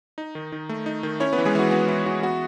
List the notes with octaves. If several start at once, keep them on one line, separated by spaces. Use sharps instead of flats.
D#4
D#3
D#3
A3
D#4
D#3
C#4 E4 C#5
B3 B4
E3
G#3 G#4
E3 F#4
B3 F#4
E4
E3 F#4
B3 F#4